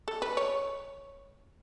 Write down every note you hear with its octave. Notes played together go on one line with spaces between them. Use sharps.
A4
B4
C#5